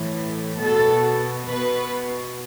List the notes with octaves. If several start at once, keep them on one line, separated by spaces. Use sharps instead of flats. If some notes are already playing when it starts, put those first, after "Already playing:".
Already playing: A2 E3
B2 A4
B2 B4